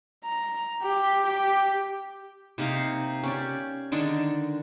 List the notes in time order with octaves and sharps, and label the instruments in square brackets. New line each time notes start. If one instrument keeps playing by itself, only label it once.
[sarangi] A#5
G4
G4
[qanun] C3 A#3 D#4 F5
C#4 G4 D5
D3 D#3 G#3 D4